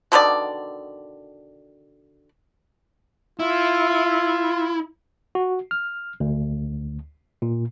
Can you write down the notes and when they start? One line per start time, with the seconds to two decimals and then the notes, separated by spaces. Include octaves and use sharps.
0.12 B2 D3 D#3 D5
3.40 E4 F4
5.35 F#4
5.71 F6
6.20 D2
7.42 A#2